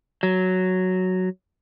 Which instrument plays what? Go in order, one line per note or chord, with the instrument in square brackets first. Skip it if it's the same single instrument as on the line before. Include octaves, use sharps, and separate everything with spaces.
[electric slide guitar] F#3